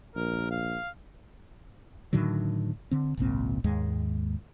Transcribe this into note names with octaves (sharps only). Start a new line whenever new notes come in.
A#1 A#4
F5
A2 D3 D#3 F#3
D3 C4
G#1 C#2 A#2 C4
D#2 G#2 G#3